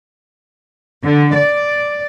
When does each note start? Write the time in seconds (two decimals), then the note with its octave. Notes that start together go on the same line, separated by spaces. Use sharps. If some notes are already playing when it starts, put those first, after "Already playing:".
1.04 D3
1.36 D5